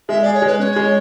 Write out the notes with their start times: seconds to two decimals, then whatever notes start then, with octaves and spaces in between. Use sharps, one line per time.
0.09 G#3 E5
0.22 G#4 D5
0.34 C#5
0.42 G#3 B4
0.59 C#4 C#5
0.76 G#3